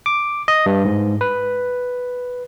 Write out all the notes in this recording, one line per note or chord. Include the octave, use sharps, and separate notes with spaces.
D6
D#5
G2
G#2
B4